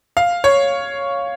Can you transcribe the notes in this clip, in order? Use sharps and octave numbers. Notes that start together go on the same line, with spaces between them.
F5
C#5